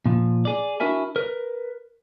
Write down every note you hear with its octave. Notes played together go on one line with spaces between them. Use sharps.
A#2 F3
G#4 D5
D4 E4 F#4 A#4 E5 G#5
A#4 B4